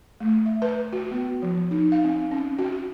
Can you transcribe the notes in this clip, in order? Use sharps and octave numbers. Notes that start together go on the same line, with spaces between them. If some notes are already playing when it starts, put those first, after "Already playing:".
A3
E5
B4
F#4
B3
F3
D#4
F5
C4
C#4
F#4